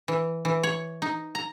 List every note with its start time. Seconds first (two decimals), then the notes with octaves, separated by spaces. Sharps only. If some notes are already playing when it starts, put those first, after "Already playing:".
0.08 E3
0.45 E3
0.63 C#5
1.02 D#4
1.35 A#5